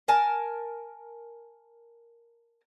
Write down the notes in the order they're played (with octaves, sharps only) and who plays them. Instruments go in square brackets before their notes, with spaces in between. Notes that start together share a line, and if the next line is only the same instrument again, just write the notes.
[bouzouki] A#4 G#5 A5